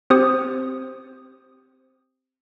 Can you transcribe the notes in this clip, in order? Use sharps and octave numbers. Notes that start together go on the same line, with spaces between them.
C4 G4 C5 D#6